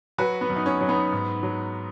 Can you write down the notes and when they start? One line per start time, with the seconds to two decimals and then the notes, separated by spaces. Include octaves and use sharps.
0.18 F#3 F#4 B4
0.41 B3
0.49 F#2
0.56 D#4
0.66 C#4
0.81 F#3
0.89 B3 D#4
1.12 G#2
1.43 F#3